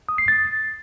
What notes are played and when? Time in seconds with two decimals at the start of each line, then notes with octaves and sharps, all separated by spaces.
0.09 D#6
0.18 C7
0.28 A6